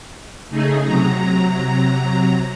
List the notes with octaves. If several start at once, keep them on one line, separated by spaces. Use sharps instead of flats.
C#3 A3 D#4 G#4
C3 F#3 A#5